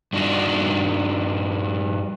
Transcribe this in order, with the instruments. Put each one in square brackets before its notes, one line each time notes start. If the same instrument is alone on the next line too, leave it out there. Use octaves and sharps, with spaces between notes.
[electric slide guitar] G2 D4 D#4 F#4 D#5